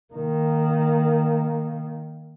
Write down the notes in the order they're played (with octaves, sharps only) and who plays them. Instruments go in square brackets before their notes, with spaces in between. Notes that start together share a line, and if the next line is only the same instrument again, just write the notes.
[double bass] D#3 A#3